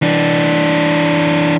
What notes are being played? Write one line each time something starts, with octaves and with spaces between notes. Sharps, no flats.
E3 D4